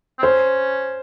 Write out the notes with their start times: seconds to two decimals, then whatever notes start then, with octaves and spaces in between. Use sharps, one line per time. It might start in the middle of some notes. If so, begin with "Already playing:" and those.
0.19 C4
0.22 C#4 C5